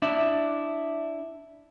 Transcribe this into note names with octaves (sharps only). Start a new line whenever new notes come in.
D4 E4 D5 E5